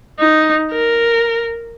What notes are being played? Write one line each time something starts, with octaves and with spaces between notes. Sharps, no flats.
D#4
A#4